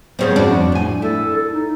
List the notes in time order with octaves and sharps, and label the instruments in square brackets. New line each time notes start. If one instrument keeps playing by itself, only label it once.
[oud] G2 C#3 F3 [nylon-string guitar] G#3 B3 C4
[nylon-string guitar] F2 F#4 [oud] D4
[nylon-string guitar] A2 G#5
[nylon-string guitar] E4 [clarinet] A4
[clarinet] A4
D#4